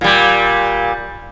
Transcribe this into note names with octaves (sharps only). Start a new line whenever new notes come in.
A#2 G3